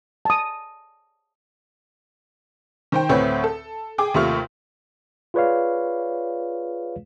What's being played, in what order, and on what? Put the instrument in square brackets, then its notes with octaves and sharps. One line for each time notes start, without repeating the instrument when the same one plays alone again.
[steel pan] A5 D#6
[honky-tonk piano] D#3 C5 G5
D2 A2 A3 C4 B4 C#5
A4
G#4 G5 D6
D#2 C3 A3 F4 C#6 F6
[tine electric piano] F4 G#4 B4 C#5 D5 F5